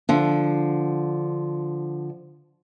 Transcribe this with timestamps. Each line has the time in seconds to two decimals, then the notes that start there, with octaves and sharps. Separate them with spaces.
0.09 D3 F3